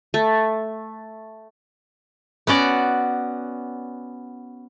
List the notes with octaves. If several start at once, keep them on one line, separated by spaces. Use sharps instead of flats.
A3
B3 C#4 F#4 D5